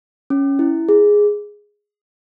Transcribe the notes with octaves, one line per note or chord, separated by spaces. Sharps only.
C#4
E4
G#4